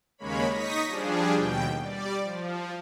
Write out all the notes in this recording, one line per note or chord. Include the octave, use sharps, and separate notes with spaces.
D#2 C#3 G#3 A#3 C#5 B5
D#4 C#6 D#6 A#6 B6
F3 G3 D4 G#4
D#2 B2 G5
G3 D5
F3